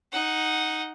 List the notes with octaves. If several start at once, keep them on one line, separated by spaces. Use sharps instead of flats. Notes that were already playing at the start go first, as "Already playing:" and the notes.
D#4 F#5